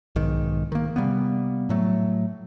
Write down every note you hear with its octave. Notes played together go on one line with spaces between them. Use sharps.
B1 G#2 D#3
D#3 A#3
C3 G3 A#3 B3
A2 F#3 A3